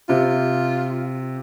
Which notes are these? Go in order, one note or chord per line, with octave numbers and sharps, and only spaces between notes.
C3 F4